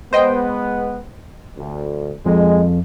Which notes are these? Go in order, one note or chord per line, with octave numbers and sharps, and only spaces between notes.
G#3 B3 C5 D#5 G5
D2
F2 G#3